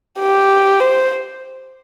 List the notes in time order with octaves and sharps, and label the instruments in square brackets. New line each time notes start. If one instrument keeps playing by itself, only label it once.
[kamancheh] G4
C5